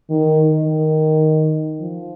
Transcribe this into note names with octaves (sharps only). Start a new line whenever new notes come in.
D#3
D#3
F3